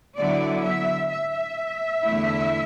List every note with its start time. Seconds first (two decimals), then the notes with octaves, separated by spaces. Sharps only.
0.17 D3 F#3 B3 E4 D5
0.64 E5
1.11 E5
2.04 E2 D3 A3 E4